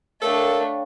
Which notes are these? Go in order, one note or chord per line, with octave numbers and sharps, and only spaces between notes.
A3 D4 A4 A#4 C#5 F5 G5